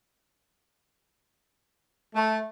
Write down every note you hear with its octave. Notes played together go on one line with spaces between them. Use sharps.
A3